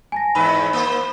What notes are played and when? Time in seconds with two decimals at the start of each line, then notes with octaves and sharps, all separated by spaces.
0.12 G#5 A5 A#6
0.35 E2 G#2 B4 B5
0.73 A#3 C5